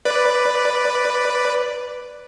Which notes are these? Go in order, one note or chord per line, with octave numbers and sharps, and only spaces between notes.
B4 D5